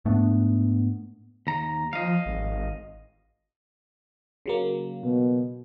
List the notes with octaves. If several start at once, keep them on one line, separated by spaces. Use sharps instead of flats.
G#2 A3 B3 D4
D#2 A#5
F3 D#5 F5
G#1
C#3 F#3 A#3
B2